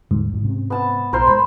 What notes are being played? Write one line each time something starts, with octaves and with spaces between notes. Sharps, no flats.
D#1 G#2 D3 G3
A1 A2
C3 C4 C#4
B3 A5
A#1 A#4 C5 C6
A2 G#3 B5